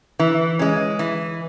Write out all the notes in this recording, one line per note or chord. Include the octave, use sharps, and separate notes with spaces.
E3
G#3 C#4
E3